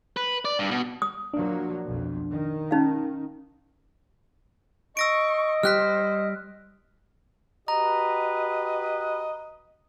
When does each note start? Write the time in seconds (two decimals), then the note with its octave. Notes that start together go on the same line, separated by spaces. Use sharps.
0.17 B4
0.45 D5
0.59 G2
0.71 B2
1.02 D#6
1.33 F3 F#3 A#3 D4
1.84 B1 F2
2.32 D#3
2.71 C#4 D#4 F5
4.97 D#5 C#6 E6 A#6 D7
5.63 G3 G4 C5 F6 F#6 B6
7.68 F#4 G4 B4 D#5 A#5